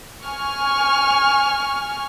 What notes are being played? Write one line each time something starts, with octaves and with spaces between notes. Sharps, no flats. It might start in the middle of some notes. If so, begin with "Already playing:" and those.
G#5 C#6 F6